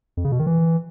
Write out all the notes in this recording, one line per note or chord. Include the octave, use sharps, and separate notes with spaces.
F2
C#3
B2
D#3
E3